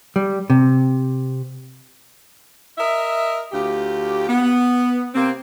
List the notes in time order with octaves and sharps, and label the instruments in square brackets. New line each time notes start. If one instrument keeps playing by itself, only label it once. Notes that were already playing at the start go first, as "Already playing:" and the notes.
[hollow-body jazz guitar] G3
C3
[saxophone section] A#4 D#5 E5
D2 F4 G4
B3
C3 A#3 C4